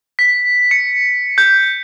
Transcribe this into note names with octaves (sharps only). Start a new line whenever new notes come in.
B6
C#7
G6